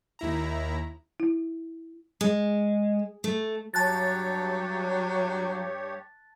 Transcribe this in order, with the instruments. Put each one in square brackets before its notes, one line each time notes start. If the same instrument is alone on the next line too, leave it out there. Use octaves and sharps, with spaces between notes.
[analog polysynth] D#2 E4 A#5
[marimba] E4
[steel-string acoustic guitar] G#3
A3
[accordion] G2 G4 C#5 [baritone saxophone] F#3 [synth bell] A5 F#6 A6